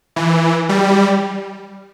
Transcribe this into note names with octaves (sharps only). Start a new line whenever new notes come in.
E3
G3